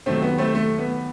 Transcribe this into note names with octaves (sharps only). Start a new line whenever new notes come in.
D#2 D#3 F#3 A3 C4
B3
A3 C4
A3
B3